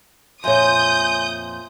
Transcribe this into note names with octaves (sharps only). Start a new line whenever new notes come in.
F2 A#2 C#5 E5 G#5 C6 D#6 G6